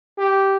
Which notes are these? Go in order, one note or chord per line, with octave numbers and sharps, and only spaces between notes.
G4